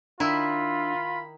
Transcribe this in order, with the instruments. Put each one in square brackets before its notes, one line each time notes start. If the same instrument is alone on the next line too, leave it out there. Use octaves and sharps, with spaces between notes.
[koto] D#3 E4 [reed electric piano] D4 E6 [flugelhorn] F4 [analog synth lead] B5